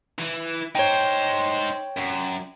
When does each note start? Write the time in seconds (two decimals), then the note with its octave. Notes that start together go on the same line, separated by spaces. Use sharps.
0.19 E3
0.75 D#4 C5 C#5 G5
1.97 F#2